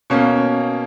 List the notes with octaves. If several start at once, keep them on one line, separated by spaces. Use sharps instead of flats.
B2 A#3 C#4